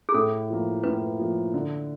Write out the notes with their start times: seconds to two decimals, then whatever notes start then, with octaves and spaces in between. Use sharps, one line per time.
0.09 G#4
0.14 A2 A4
0.50 F3 A#3
0.84 A2 B4
1.19 F3 A#3
1.54 D3